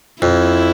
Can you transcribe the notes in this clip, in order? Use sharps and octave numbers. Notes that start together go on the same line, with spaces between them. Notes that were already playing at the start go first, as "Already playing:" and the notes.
F2 E4